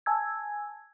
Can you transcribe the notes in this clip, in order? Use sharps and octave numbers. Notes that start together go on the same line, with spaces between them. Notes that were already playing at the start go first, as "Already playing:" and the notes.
G#5 A5 E6 G#6